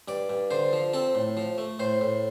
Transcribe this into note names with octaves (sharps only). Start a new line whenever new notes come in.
G2 D5
G2
D3 C5
F3
C4 A4
A2
F3
A3
A2 C5
A2